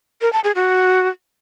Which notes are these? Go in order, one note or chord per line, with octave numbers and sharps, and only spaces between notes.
A#4
A5
G#4
F#4